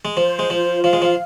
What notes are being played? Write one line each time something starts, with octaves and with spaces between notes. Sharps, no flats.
G#3
F3 C5
G#3
F3 F4
F3 F5
G#3
F3